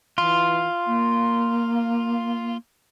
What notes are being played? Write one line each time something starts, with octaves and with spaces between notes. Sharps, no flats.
E3 F4
A#3